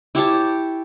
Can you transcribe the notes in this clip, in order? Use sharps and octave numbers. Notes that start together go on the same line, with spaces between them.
E4 G4 C#5 A5